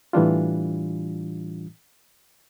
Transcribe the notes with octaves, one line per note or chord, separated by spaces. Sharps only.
A2 E3 G3 D4 F4